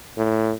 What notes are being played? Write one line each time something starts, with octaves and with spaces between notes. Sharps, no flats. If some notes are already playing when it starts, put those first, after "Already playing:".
A2